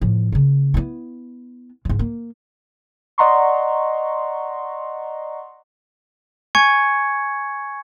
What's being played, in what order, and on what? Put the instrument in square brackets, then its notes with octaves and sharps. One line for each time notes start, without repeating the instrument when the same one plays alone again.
[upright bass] A2 F3
C#3 A#3
B3 E4
G#2 E3
A#3
[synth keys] D5 D#5 F#5 A#5 C6 C#6
[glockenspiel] G#5 C#6 G#6 C#7